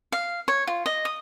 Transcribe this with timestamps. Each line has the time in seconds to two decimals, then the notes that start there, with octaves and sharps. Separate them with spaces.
0.12 F5
0.48 C#5
0.67 F4
0.86 D#5
1.05 D#6